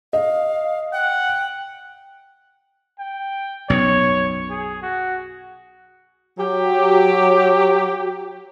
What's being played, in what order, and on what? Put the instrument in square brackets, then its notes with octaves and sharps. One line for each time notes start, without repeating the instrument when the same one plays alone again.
[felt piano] D#5 [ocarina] F5
[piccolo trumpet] F#5 [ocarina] G5
[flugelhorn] G5
[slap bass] B1 F#2 B2 [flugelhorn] C#5
[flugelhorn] G#4
F#4
[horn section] F#3 G4